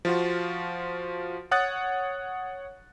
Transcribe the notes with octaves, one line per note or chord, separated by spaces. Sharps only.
F3 F4 F#4
C#5 F#5 D#6 F#6 A6